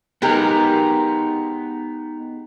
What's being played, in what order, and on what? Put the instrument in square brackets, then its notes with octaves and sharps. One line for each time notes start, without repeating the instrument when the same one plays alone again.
[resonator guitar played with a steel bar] G#3 G4 A#4 [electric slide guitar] B3 D#4